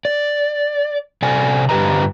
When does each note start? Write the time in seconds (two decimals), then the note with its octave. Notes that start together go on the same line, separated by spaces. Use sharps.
0.05 D5
1.22 C3 A4 D5 G#5
1.69 G2 D3 G4 B4 D#5 A#5